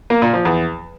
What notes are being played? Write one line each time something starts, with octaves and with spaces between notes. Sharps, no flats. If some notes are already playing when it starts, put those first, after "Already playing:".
A#3
A#2
F3
E2